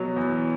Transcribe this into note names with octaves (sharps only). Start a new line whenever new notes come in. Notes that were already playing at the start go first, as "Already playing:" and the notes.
Already playing: B2 F#3
E2